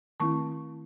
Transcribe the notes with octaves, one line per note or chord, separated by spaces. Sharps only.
D#3 A3 C4 E4 A5 C#6